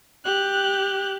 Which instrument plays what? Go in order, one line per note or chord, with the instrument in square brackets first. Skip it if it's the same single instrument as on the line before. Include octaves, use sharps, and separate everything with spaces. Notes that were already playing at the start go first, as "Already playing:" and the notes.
[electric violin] G4 F#6